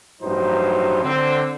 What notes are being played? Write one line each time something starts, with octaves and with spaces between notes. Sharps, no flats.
A1 G2 F3 F#3 D#4 C5
D3 C4